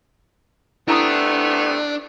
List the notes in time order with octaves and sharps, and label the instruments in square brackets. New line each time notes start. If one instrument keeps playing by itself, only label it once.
[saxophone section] C3 A3 B3 [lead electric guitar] D4 [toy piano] E4 A#5 D#6